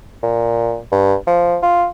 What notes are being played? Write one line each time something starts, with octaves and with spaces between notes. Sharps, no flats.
A#2
G2
F3
F4